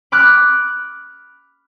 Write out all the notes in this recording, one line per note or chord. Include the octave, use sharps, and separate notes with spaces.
B5 D6 F6 F#6